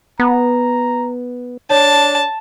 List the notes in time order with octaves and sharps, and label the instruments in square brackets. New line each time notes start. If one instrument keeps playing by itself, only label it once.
[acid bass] B3 [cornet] A#5
[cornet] D4 [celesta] C#5 [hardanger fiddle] A5